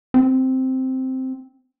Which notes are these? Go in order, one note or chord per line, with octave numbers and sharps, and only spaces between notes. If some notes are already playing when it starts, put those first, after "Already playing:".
C4